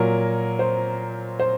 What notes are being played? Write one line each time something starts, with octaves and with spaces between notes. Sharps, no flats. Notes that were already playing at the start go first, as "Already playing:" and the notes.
Already playing: A#2 F#3 A#4
C5
C5